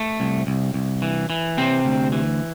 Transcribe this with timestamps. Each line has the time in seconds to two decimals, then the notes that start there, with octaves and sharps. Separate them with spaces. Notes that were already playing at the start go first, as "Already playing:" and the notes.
Already playing: A3
0.20 C2
0.47 C2
0.74 C2
1.02 E3
1.30 E3
1.57 C3 C4
1.85 D2
2.12 E3